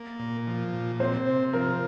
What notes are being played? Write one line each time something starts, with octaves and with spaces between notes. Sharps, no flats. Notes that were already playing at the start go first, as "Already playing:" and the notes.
Already playing: A#3
A#2
F3
A#2
C4 C5
C3
F3 A#4